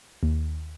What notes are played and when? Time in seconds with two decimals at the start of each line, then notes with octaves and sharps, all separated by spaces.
0.23 D#2